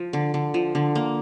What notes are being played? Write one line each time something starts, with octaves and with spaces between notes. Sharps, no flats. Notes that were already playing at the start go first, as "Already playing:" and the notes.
Already playing: F3
D3
D3
F3
D3
A#3